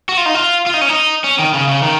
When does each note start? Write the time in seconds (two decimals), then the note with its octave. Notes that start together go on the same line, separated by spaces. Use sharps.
0.09 F#4
0.17 F4
0.26 D#4
0.35 F4
0.66 F4
0.74 D#4
0.81 C#4
0.89 D#4
1.24 C#4
1.39 D#3
1.54 C#3
1.68 C#3
1.83 D#3